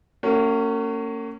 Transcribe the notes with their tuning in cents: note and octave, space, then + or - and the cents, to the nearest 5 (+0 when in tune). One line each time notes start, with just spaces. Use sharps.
A#3 -40 C#4 +0 F#4 +30